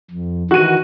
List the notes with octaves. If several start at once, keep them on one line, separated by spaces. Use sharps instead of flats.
F2
D#3 E3 F#4 D#7